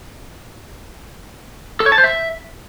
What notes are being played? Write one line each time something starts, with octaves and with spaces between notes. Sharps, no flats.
A4
C#5
A5
C5
E5